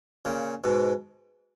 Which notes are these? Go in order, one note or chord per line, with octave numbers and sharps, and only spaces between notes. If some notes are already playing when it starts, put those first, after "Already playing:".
A#2 C#3
G#2 B2